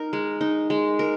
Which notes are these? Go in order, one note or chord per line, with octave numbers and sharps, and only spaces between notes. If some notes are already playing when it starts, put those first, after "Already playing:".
Already playing: D#4 A#4
G#3
D#4
G#3
A#4